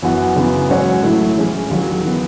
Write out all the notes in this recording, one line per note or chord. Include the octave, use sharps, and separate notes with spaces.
F#2 E3 B3 F#4
F#2 C#3 E3 B3
G#2 F#3 C#4 F#4 C#5
A2 F#3 A3 E4
E3 G#3 C#4 G#4
D#2 D#3 F#3
E3 B3